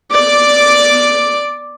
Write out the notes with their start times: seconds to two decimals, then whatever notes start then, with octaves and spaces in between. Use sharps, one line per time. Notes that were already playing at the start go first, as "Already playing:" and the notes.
0.12 D5 D6